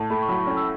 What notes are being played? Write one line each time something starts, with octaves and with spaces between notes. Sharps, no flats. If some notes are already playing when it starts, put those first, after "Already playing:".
Already playing: A2 A5
A3 B5
C#6
F#3 B5
C#6
C#4
E6